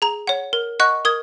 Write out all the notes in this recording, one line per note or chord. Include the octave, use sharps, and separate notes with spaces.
G#4 A#5
C#5 F#5
A#4
D#5 F#5 C#6 F#6
A#4 D#6 G#6